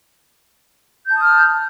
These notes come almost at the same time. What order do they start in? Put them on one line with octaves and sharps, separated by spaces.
G6 A5 D#6 F6